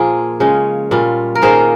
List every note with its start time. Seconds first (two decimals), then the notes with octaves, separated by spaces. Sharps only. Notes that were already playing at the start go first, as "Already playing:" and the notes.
Already playing: A#2 F3 A#3 F4 G#4
0.40 C#3 G#3 C#4 F4
0.91 A#2 G3 C#4 F4
1.35 A#4
1.42 D#3 A#3 C#4 F4 G#4 C5